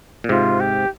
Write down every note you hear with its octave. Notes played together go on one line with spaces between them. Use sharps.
A#2
G#2 C3 F4
G4